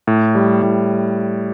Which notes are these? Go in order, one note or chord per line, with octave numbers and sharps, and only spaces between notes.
A2
G3
A2